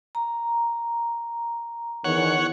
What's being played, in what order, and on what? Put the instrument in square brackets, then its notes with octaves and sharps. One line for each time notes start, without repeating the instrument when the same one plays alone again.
[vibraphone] A#5
[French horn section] E2 D#3 E3 [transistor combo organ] C#5 F#5